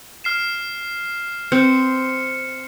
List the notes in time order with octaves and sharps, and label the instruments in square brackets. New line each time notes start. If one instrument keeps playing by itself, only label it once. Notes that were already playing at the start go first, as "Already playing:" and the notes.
[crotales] F6 C7 E7
[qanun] C4 [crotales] C#7